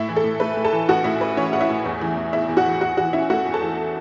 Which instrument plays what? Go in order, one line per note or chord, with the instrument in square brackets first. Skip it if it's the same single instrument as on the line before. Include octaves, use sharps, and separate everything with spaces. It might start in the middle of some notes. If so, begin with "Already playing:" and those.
Already playing: [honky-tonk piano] A2 E4 E5
E3
A4
A2
A3 B4
A2
A4 A5
E3
A1 F#4 F#5
A2 E4 E5
A1 B4
E3 C#4 C#5
A1 F#5
E4 E5
A2
E2
E3
E2
B3 E4 E5
E2
F#4 F#5
E3
E2 F#4 F#5
E3 F#4 F#5
C#4 E4 E5
A3 F#4 F#5
E2
A4 A5
E3